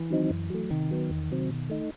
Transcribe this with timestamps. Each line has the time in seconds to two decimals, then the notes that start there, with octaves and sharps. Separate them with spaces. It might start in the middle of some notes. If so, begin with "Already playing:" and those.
Already playing: E3
0.10 D#3 F#3 C4 D#4
0.30 F#2
0.50 F#3 A3
0.70 C3 D#3
0.91 F#3 B3
1.10 E2
1.31 C3 F#3 C4
1.50 B2
1.70 A3 D#4